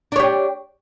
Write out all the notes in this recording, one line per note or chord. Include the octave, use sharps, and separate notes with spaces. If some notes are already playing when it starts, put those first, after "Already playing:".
D4 G4 C#5